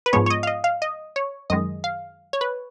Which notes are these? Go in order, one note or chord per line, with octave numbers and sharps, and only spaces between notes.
B4
G#2 F3 G#3 B3 C#5
C#5
D#5
F5
D#5
F5
D#5
C#5
F#2 D#3 G#3 D#5
F5
C#5
B4